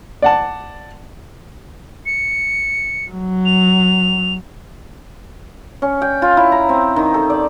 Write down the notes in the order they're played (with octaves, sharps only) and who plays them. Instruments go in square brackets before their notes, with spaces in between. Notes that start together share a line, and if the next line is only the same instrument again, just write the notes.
[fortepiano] D5 F#5 A5
[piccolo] C#7
[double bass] F#3
[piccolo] F7
[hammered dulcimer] C#4
G5
F4
E4
A#5
C4
D#3
A4
D5